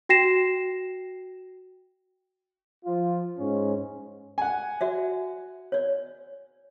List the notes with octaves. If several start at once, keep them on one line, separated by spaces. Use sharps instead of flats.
F#4 G5 A#6 C7 E7
F3 F4
G#2 C#4
F#5 G#5
F#4 D5 E5
C#5 D5